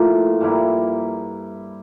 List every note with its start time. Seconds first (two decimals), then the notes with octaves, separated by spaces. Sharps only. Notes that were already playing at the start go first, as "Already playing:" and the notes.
Already playing: A2 F3 A#3 F4
0.41 G2 F3 A#3 E4